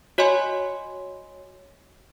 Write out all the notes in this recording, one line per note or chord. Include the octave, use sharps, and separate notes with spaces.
F#4 C#5 D#5 G#5 C6